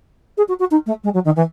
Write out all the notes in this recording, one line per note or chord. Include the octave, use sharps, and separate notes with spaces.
G#4
F#4
F#4
D#4
A3
G#3
F#3
D#3
E3